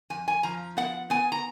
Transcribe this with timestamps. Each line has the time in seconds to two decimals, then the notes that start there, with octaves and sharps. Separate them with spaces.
0.10 F2 G#5
0.28 G#5
0.43 F3 A#5
0.77 B3 F#5
1.10 B3 G#5
1.32 A#5